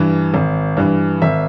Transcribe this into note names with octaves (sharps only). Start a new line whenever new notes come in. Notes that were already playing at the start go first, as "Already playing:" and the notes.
Already playing: G2 E3
G#1
G2 E3
G#1 E5